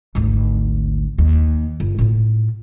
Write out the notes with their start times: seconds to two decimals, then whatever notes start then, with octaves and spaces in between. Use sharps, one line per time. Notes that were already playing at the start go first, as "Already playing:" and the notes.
0.15 G#1 D2
1.18 D#2
1.80 G1
1.99 A2 F4